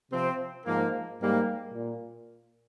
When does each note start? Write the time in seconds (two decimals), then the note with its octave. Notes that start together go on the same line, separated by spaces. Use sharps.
0.12 C3 F3 C4
0.66 G#2 F3 A#3
1.20 G#2 G3 A#3
1.74 A#2